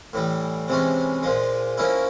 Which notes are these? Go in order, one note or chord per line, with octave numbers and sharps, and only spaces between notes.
A2 E3 G3
C3 E3 G#3 C#4
A#2 F3 G#3
F3 A#3 C#4 E4